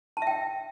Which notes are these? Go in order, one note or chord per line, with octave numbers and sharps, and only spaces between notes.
A5
E5
G5